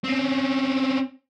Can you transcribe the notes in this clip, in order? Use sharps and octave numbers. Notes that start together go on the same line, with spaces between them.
C4 C#4